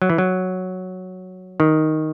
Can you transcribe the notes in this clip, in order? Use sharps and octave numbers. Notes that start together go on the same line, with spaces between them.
F#3
E3
F#3
D#3